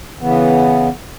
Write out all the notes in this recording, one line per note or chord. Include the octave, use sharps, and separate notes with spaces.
C#3 E3 B3